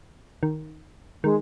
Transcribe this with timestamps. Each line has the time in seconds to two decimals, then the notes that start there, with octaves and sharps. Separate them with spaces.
0.43 D#3
1.23 D#3 G#3